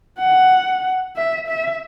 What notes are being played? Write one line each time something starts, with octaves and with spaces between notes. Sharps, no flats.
F#5
E5
E5